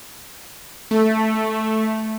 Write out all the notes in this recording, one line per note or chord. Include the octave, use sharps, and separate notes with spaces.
A3